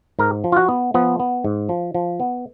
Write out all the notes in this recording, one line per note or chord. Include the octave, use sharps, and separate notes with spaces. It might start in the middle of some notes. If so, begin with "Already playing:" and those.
G#2 A#4
F3
F4
F#4
B3
F3 B3
B3
G#2
F3
F3
B3